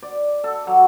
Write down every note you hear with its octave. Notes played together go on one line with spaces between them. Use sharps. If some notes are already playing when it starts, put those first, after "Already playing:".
D5
A4
F#3